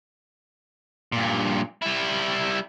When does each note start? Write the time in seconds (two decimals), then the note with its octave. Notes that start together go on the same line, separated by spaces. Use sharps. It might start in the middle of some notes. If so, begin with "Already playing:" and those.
1.12 G2 A#2
1.82 G3 E4